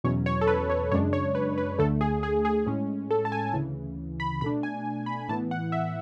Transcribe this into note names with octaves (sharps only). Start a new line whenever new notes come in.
E2 B2 F#3 C#4 C#5
C#5
A4
B4
C#5
F#2 C#3 G#3 D4 C#5
C#5
B4
B4
D2 D3 A3 A4
G#4
G#4
G#4
A2 G#3 C#4
A4
A5
G#5
D2 C#3 E3
B5
B2 A3 D4 B5
G#5
B5
A2 E3 B3 A5
F#5
E5